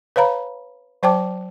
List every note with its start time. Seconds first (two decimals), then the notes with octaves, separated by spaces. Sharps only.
0.16 B4 C#5 F5 A#5 B5
1.03 F#3 C5 G5 A5 D6